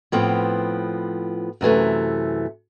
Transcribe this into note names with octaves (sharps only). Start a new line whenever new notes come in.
A2 F3 B3 C4
F#2 C3 E3 A3